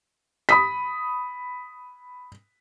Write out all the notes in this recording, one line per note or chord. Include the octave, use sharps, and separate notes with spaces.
B5 D#6 B6